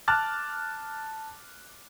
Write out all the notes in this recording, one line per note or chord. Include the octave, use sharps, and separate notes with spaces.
A5 D6 F6 F#6 A6